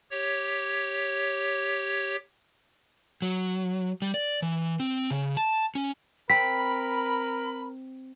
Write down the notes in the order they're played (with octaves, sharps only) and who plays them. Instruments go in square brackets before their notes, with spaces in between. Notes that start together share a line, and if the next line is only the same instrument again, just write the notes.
[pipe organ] G4 C#5
[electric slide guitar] F#3
G3
D5
E3
C4
C#3
A5
C#4
[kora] C4 [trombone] A#4 [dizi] B5 [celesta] B6